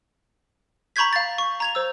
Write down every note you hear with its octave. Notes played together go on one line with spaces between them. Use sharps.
A#5 B5 C#6 G6 G#6 B6
F5 A6
C#6
A#5 G#6 F7
C5 E6